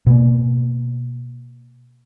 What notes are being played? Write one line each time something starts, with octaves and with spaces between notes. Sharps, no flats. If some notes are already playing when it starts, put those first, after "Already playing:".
B2 A#3